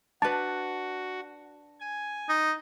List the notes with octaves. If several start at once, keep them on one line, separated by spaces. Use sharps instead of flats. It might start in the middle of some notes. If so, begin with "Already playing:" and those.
D4 F#4 B4 A5 A6
G#5
D#4